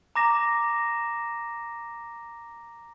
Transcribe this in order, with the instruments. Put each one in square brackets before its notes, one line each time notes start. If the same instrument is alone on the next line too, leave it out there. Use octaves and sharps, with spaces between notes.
[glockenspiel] A#5 D6 A#6 E7